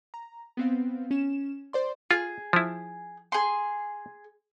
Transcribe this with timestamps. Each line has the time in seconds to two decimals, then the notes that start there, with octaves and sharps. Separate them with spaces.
0.14 A#5
0.57 B3 C4 F5
1.11 C#4 E7
1.73 C5 D5 C6
2.11 F4 G#4
2.53 F3 E4
3.32 G#4 C6